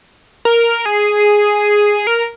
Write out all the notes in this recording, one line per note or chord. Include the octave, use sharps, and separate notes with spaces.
A#4
G#4
A#4